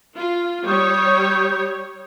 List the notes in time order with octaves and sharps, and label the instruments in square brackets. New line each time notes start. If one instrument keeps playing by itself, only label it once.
[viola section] F4
[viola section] G3 C#5 [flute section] D#6 G6